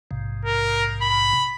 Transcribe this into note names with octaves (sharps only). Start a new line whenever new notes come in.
A#1 G#2 C3
A#4
B5